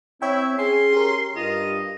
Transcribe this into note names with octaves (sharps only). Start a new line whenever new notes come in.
C4 E4 C#5 E5 G5
C#4 G#4 G#5 C6
G4 A#4
G2 F4 D#5